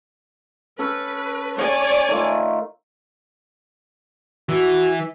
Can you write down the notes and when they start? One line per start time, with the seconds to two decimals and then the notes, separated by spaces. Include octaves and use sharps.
0.79 C#4 A4 B4
1.59 C#5 D5 G#5
2.08 D#3 A3 F4
4.49 E3 F#4